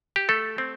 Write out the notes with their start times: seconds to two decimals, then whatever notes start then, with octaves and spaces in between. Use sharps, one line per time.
0.16 G4
0.29 A3 A4
0.58 C4